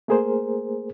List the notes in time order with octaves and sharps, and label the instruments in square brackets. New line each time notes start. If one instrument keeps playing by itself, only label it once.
[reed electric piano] A3 A#3 G#4 A#4 C5